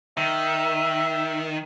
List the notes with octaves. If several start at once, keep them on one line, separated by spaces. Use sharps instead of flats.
D#3 E5